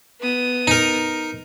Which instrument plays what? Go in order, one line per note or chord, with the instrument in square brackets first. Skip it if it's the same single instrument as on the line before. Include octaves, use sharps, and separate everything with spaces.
[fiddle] B3 D#6
[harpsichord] D#4 A#4